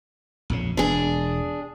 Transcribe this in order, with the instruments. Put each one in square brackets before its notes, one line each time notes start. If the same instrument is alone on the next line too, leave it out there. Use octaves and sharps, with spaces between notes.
[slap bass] A#1 F2 C#3
[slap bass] E1 [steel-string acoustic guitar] D4 G#4